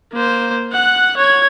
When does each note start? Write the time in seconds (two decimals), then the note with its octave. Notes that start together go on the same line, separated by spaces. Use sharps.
0.13 A#3 C5
0.72 F#5 F#6
1.17 C#5 G#6